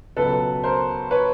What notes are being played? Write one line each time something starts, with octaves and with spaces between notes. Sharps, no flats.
C#2 B2 F#3 A4 B4
A#4 C5
B4 C#5